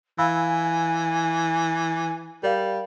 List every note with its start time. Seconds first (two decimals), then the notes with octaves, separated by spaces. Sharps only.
0.18 E3 F5 G#5 B5 E6
2.43 G3 A#4 D5 F5